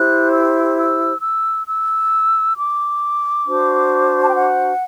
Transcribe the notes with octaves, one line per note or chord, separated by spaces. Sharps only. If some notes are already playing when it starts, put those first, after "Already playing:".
Already playing: E4 G4 C5 F#6
E6
E6
E6
E6
D6
D4 F#4 C5
A5
G5
F#5